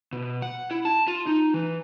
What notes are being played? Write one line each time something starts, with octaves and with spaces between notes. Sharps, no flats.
B2
F#5
E4
A5
F4
D#4
E3